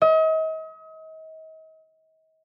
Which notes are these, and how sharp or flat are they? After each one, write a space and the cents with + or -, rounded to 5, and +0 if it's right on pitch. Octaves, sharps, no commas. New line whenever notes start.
D#5 +40